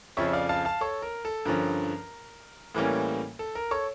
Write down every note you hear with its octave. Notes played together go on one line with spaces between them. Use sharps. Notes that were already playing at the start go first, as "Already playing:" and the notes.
F2 C#3 F3 C#5 E5
D5 F5
F5 A5
F5 A5
A4 C#5
A#4
A4
G2 D3 F3 C#4 A#4
A2 E3 G3 A#3 C#4
A4
A#4
A4 C#5